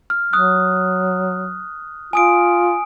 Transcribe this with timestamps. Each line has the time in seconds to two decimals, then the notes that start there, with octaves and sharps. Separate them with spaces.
0.10 F6
0.33 F#3 D#6 F#6
2.13 F4 G#5 D#6 D7